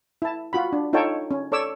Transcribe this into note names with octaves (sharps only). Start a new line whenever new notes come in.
E4 A5
F4 F#4 B5
D4
D#4 F4 A4 C#5 G5 A5
C#4
A4 C#5 D5 D6 E6